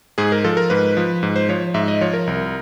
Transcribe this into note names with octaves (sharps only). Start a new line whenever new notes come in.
G#2 G#4
A#4
F3 A4
A#4
G#2 B4
F3
G#2
C5
F3 C#5
G#2 E5
D#5
F3 C#5
A#4
C2